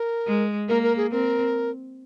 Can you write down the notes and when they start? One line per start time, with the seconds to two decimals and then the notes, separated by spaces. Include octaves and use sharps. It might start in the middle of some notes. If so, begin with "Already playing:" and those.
Already playing: A#4
0.27 G#3
0.69 A#3 A#4
0.83 A#4
0.97 G#4
1.12 C4 A#4